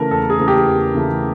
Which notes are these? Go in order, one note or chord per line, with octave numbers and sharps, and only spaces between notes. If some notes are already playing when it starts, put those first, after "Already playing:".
Already playing: C#3 E3 A3 A#4
E2 A4
G#4
C#3 E3 A3
G4
E2
C#3 E3 A3